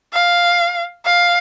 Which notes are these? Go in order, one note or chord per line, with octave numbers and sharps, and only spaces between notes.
F5
F5